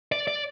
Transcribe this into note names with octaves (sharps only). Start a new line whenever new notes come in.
D5
D5